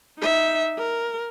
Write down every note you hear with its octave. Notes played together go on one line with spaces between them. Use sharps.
D#4 E5
A#4